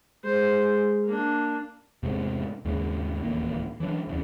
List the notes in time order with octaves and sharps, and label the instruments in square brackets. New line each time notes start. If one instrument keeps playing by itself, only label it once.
[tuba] G#3 [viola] C5
[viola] A#3 D4
[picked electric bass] E2 G#2 C3 A3
D#2 G#2 C#3
D1 A1 D#2 A#3
E3 F#3 D4
D1 E2 C#3